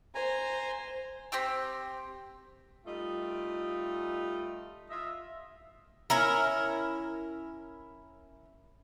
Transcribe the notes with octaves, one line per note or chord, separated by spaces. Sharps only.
C5 G#5 A#5
C4 G4 G5 E6
G3 A3 D#4 F4
F4 D#5 E5
C#4 E4 A#4